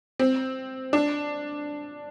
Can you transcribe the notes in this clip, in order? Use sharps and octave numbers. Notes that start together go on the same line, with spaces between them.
C4
D4